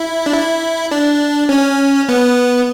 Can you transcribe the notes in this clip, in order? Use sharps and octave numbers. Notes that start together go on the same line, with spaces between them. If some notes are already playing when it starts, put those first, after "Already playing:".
Already playing: E4
D4
E4
D4
C#4
B3